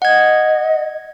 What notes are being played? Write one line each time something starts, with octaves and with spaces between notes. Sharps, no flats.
D#5 F#5 G#6